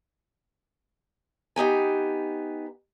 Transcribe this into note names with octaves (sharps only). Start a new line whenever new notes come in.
B3 D#4 G4 G#5